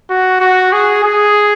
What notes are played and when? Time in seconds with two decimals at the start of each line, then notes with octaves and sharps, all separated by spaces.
0.10 F#4
0.41 F#4
0.73 G#4
1.04 G#4